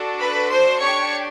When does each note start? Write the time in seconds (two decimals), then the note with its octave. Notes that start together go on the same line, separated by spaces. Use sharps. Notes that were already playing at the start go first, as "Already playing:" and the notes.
Already playing: D4 F#4 A4
0.19 B4 B5
0.49 C5 C6
0.79 D4 G4 C#5 C#6